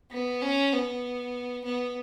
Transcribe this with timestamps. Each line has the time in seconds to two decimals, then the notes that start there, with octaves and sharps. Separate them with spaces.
0.11 B3
0.41 C#4
0.73 B3
1.65 B3